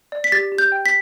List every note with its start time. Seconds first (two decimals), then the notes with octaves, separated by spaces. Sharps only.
0.12 D5
0.24 B6
0.32 G4 A6
0.52 G4
0.58 G6
0.72 G5
0.86 B6